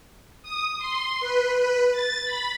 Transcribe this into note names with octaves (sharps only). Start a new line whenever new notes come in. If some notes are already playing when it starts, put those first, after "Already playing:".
D#6
C6
B4
B4
A6
B5